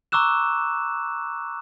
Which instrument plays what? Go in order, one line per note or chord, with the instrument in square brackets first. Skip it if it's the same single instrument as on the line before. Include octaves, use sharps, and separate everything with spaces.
[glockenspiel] A#5 C#6 D6 E6 F#6 E7